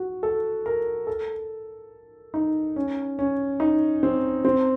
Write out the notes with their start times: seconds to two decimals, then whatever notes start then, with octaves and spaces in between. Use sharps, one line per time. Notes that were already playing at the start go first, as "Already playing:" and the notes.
Already playing: F#4
0.23 A4
0.66 A#4
1.07 A4
2.34 D#4
2.76 C#4
3.19 C#4
3.60 D#4
4.03 C4
4.45 C4